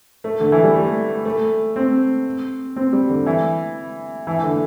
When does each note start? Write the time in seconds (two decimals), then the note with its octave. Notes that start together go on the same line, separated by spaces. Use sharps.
0.24 A3
0.40 D3
0.52 E3
0.64 G3
0.75 A3
1.25 A3
1.76 C4
2.76 C4
2.93 G3
3.10 D3
3.26 E3
4.27 E3
4.39 E3
4.43 D3